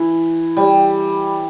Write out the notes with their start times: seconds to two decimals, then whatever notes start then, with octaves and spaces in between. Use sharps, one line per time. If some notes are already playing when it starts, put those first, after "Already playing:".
Already playing: E3
0.57 G3